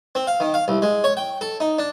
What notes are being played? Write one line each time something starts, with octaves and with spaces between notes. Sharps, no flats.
C4
F5
D#3
F5
C2
G#3
C#5
G5
A4
D#4
D4